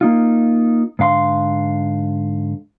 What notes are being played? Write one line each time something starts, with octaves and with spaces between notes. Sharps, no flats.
A#3 D#4 F4
G#2 D3 F5 B5 C6